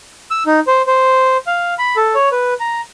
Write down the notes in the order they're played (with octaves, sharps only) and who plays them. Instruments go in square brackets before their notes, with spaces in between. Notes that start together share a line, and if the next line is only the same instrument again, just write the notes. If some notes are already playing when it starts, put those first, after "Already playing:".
[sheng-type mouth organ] E6
D#4
C5
C5
F5
B5
A4
C#5
B4
A#5